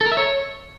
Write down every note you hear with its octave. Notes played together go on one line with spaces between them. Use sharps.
A4
A#4
E5
C#5